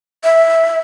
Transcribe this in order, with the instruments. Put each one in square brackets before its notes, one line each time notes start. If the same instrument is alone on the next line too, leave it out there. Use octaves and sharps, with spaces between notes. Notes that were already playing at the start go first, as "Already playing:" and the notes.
[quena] E5